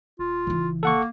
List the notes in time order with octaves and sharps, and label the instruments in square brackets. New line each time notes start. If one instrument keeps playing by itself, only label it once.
[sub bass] D#1 [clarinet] F4
[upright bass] C#3 E3
[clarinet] A#3 [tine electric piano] A4 F#5 C#6